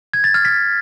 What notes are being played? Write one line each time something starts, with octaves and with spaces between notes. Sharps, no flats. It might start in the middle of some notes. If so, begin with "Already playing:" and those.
G#6
A6
F6
B6